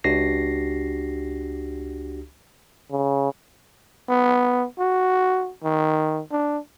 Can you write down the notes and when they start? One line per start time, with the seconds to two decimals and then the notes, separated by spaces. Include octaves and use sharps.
0.04 C#2 D4 F#4 G4 A#6 C7
2.91 C#3
4.09 B3
4.80 F#4
5.63 D#3
6.31 D4